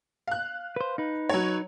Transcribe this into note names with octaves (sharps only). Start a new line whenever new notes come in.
F5 F#6
B4 C5
D#4 B4
F#3 C#5